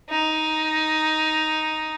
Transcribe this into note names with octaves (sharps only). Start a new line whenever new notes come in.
D#4